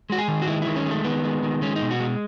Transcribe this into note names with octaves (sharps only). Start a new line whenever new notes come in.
G#3 F#4
G#4
D#3
F#4
G#3 E4
E4
D#3
C#4
G#3 A3
D#3 B3
G#3
D#3
G#3 C#4
D#4
B2
F#4
G#3